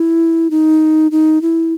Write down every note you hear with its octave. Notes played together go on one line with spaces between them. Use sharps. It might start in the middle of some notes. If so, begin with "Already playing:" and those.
Already playing: E4
D#4
D#4
E4